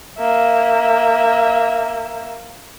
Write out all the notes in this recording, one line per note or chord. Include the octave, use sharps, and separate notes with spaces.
A#3 E5